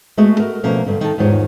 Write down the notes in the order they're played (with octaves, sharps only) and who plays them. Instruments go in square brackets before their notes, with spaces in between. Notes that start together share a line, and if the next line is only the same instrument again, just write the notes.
[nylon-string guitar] G#3 A3 B3 F#4 G#4
F#4 A#4
B2 F3 A3 A#3 C#4
G2 D3
D#3 A4
E2 G#2 D#3 D#4 F4 C#5